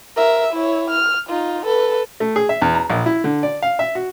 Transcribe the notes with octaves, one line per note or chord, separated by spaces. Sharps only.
A#4 E5
E4 C#5
F6
D#4 F4
A4 B4
A3
G#4
E5
E2
A#5
A#1
E4
D3
D5
F5
E5
F#4